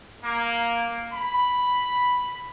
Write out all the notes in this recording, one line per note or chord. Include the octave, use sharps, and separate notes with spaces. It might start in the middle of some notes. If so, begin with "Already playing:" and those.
A#3
B5